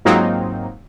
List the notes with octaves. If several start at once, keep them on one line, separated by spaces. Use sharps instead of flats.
G#2 F#3 A#3 C4 D#4 F4